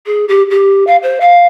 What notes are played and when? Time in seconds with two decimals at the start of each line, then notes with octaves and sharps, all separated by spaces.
0.06 G#4
0.28 G4
0.50 G4
0.86 F5
1.02 C5
1.20 F5